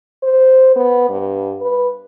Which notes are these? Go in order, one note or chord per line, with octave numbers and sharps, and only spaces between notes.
C5
B3
G2
B4